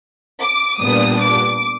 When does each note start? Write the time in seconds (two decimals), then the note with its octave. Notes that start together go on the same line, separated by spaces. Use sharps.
0.41 D6
0.82 A#2 G3 B3 D4 D#6
1.21 D6